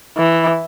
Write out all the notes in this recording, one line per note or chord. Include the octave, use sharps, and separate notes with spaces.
E3